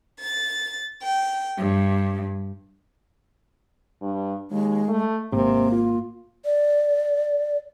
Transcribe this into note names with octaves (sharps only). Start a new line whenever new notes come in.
A6
G5
G2
G2
D#2 G#3
A3
G#1 C3 A#3
F4
D5